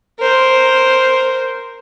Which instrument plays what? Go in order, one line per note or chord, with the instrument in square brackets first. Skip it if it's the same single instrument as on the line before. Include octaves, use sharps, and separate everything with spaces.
[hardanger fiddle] A#4 C5